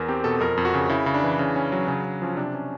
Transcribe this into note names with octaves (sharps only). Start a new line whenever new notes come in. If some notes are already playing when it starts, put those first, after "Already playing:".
Already playing: E2 A#4
C4 G4
B2 A4
F2 A#4
F2
F#4
C#3
C#3 E4
C#3
D4
E3
C#3
C#4
F#3
C#3
C#3
F3 C#4
C3 D4
C#4